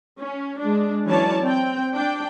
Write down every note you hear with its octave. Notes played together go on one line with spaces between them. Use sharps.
C#4
G#3 D4
E3 F#3 C#4 C#5 D5 A5
C4 G5
D4 G5